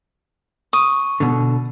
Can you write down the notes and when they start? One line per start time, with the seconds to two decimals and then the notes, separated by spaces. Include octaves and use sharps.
0.73 C#6 D#6
1.20 B2 D3